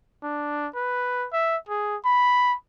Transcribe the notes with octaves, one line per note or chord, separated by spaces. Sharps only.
D4
B4
E5
G#4
B5